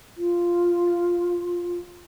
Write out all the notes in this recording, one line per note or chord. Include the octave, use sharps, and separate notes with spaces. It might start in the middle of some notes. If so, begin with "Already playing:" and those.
F4